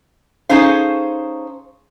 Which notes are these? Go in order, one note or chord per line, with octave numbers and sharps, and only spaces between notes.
C#4 D#4 G#4 A4 C5 F5